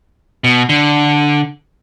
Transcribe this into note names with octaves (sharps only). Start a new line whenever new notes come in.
B2
D3